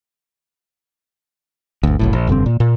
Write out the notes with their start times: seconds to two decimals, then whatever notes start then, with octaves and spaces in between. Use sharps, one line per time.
1.83 G1 D2
1.99 F#1 B1 A2
2.13 A#1
2.27 F1 G2 D3 C4
2.46 A#2
2.60 A#2